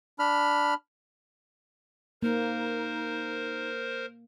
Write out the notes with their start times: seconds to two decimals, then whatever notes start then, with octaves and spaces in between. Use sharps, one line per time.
0.19 D4 B5 F6
2.23 A#3 D#4 A#4 C5